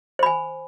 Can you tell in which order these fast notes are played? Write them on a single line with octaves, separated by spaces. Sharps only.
C5 B5 G#5